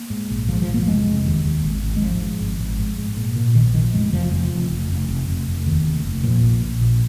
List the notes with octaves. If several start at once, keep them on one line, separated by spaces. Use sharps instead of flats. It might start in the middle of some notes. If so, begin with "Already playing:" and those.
Already playing: A#3
G#2
A#1
G#2 F3
F3
A#1
A#3
F3
F1 G#3
F1
D#2
D#2
G#1
G#1
G#3
G#1 F3
G#2
G#1
G#1
G#2
G#2
A#2
A#2
A#1 D#3
F3
A#2 D#3
F3
F1 G#3
F1 F3
F1 F3
F1
F1
F1
F1
F1
F1
D#2
F1
F1
A#2 F3
A#1
A#1
A#2